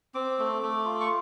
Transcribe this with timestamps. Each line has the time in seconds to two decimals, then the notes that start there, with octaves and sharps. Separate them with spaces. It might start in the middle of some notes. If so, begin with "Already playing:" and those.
0.14 C4 D6
0.39 A3
0.63 A3
0.85 F4
1.00 C#6